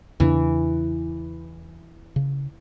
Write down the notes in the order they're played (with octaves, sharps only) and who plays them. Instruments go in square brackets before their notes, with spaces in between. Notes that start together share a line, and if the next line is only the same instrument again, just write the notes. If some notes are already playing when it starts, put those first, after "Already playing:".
[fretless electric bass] E2 C#3 D4 [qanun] E3
[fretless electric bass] C#3